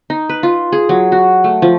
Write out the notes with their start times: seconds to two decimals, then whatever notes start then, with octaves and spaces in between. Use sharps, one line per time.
0.10 D#4
0.29 B4
0.43 F4
0.72 G#4
0.89 F#3
1.12 F#4
1.44 A3
1.62 F3